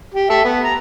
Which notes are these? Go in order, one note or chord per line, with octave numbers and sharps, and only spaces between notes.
G4
A4 E5
B3
A#5